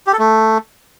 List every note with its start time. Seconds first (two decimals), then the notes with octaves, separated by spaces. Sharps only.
0.07 G4
0.13 A4
0.19 A3